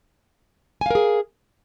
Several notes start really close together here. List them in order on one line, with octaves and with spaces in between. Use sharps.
G#5 F5 A#4 G#4